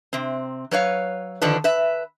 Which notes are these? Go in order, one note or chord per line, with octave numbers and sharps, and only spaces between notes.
C3 C4
F#3 B4 C#5 F5
D3 D#3 F3 D4 B4
B4 E5